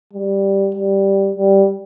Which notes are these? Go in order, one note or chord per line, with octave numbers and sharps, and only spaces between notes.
G3
G3
G3